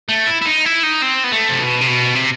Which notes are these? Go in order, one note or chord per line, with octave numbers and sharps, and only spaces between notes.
A3
E4
E4
D#4
E4
D#4
C4
B3
A3
C3
B2
C3
B2
C3